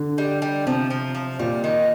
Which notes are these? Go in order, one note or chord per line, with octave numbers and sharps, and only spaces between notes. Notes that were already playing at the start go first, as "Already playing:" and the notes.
Already playing: D3
G3
G3
C3 F3
F3
F3
A#2 G3
D#3